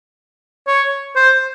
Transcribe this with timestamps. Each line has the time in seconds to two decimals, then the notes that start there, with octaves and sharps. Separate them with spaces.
0.67 C#5
1.16 C5